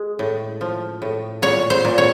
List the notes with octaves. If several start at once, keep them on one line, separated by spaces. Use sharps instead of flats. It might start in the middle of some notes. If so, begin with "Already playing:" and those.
Already playing: G#3
A2
F3
A2
A#2 C#5
C5
A#2
C#5